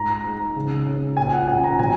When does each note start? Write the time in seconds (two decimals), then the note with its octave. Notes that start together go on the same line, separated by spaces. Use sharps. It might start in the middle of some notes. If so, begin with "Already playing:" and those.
Already playing: G#2 A#5
0.25 G#3
0.56 C#3
0.87 C#4
1.17 A#2 G#5
1.33 F#5
1.47 C#4 G#5
1.64 A#5
1.79 B2 G#5